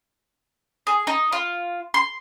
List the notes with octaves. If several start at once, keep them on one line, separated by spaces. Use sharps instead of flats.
G#4
D#4
F4
C6